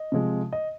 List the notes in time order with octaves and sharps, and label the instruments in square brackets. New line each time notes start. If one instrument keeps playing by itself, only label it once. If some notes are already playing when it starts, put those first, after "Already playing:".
Already playing: [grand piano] D#5
C3 F3 G#3
D#5